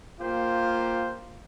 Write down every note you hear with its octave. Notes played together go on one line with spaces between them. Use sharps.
A#3 F4 G4 C5